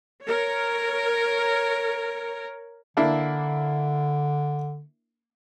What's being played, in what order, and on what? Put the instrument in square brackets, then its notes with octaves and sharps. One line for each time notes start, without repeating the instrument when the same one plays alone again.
[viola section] A#4 C#5
[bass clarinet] D3 [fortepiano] A#3 D4 E4